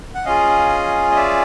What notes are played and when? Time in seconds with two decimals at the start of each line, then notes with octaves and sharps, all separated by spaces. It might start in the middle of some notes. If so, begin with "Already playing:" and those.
0.15 F#5
0.25 C#4 F4 G#4 D#5 F5
1.11 D#5
1.16 D5 E5